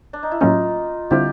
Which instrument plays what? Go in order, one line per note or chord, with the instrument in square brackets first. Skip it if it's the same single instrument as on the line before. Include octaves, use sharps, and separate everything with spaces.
[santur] D4
D#4
E4
[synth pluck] A2 F#3 A#3 C#4 [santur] D#4 F4
[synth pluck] D3 G3 C4 E4 [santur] F4 G4